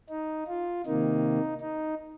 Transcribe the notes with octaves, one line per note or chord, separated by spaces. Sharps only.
D#4
F4
C3 D#3 A#3 D#4
D#4